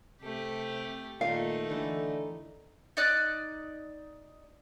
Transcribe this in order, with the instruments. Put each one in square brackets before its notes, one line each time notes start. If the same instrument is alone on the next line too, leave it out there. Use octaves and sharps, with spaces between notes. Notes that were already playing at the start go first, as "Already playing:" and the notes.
[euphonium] C3 [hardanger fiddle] A3 G4
[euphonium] A#2 [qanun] D#3 F4 A#4 [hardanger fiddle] A3 D#4 [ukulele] F5
[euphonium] D3 [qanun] E3 A4
[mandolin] D#4 D5 F#6